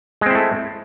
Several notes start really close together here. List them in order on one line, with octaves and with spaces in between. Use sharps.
G#3 C4 E4 A3